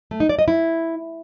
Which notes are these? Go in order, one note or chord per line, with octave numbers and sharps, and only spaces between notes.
A3
D#4
D5
D#5
E4